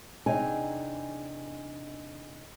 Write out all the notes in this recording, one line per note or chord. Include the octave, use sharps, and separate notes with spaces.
E2 C3 D4 D#4 G#4 G#5